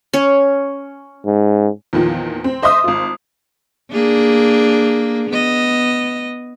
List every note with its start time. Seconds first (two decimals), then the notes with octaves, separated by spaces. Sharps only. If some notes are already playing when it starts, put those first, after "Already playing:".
0.13 C#4 C#5
1.26 G#2
1.93 E2 A#2 D#3 F3
2.44 C4
2.62 C5 D#5 E5 C6 D#6
2.84 G#1 F4
3.92 A#3 D4 G#4
5.30 B3 D#5